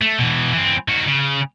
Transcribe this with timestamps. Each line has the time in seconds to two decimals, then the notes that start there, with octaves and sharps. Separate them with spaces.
0.01 A3
0.18 B2 E3
0.53 E3 C4
0.88 D#3 F#4
1.07 C#3